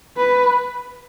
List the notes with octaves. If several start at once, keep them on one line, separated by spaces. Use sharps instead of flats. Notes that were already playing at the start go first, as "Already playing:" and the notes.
B4